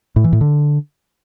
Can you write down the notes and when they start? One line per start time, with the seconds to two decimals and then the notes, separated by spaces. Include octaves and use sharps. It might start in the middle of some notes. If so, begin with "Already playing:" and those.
0.16 A2
0.24 E3
0.33 A2
0.41 D3